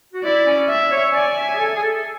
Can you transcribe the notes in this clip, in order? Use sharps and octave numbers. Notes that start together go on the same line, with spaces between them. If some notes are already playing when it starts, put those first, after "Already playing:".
F#4
E4 D5
C#4
E5
C#5
D5 G#5
E5
G#4
A4
G#4
A4